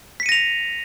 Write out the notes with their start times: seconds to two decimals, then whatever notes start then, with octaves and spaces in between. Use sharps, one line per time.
0.20 B6
0.23 C#7
0.26 D#7
0.29 A#6
0.32 F7